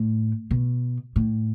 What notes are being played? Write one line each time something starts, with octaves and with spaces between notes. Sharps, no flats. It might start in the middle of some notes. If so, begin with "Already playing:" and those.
Already playing: A2
B2
A2